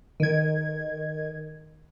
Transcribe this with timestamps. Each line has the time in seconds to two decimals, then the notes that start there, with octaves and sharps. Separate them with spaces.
0.20 D#3 G#6